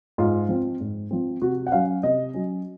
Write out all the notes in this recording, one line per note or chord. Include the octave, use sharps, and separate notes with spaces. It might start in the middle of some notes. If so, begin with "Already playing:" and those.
G#2 F4
F3 C4
G#2
F3 C4
C3 F#4
F#5
F#3 C#4 F5
C3 D#5
F#3 C#4